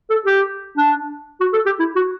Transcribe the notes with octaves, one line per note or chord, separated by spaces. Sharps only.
A4
G4
D4
F#4
A4
G4
E4
F#4